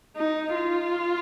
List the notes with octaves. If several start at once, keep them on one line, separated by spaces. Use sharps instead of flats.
D#4
F4